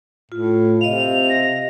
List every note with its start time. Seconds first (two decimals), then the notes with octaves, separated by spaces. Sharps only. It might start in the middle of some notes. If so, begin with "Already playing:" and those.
0.32 A2 F4
0.81 C3 D#5 F5 F7
1.30 A#6